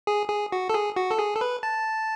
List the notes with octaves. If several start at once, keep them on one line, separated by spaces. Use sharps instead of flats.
G#4
G#4
F#4
A4
G#4
F#4
A4
G#4
A4
B4
A5